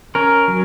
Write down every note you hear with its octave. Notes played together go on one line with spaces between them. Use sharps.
C#4 A#4
F#3